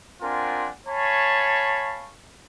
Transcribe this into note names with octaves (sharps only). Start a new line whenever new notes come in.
C4 D4 F4 A#4 F#5 G#5
C#5 F5 G#5 A5 B5 C#6